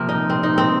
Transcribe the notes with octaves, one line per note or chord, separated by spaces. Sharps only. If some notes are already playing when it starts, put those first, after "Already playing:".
Already playing: C3 F3 A#3
D#4
C4
D#4
C4